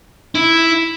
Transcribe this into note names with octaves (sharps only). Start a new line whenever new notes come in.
E4